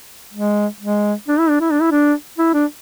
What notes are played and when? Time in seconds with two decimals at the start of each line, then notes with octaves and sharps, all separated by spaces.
0.33 G#3
0.80 G#3
1.28 D4
1.39 E4
1.49 D4
1.60 E4
1.71 D4
1.81 E4
1.91 D4
2.38 E4
2.54 D4